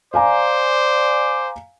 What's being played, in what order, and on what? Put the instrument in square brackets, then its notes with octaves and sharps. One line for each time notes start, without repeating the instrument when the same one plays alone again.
[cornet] C5 [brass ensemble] D5 [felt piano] F5 G#5 A#5 [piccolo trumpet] D6